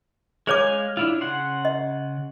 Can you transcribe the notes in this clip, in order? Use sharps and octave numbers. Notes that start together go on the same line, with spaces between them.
G#3 G#4 C#5 F5 G#5 D6
D4 E4 F4
C#3 F#5 C6
D#5